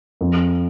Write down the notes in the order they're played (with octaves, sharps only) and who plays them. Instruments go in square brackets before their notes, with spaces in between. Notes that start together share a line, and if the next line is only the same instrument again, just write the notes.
[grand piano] F2